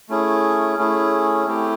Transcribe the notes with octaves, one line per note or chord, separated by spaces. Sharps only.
A3 C#4 E4 G#4
A3 C#4 E4 G#4
A3 C4 E4 G4